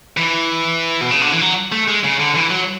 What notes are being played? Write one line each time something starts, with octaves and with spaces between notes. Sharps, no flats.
E3
B2
C#3
D3
E3
F#3
A3
G#3
C#3
D3
E3
F#3